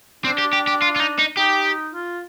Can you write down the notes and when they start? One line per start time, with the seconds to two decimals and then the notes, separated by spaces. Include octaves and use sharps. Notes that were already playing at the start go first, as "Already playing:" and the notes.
0.25 C4 D4
0.38 G4
0.53 G4
0.68 G4
0.82 F4
0.96 F4
1.00 D#4
1.19 D#4
1.37 D#4 G4
1.94 F4